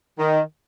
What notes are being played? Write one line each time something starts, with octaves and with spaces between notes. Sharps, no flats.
D#3